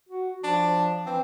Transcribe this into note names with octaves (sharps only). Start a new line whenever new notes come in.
F#4
F3 D4
E3 C4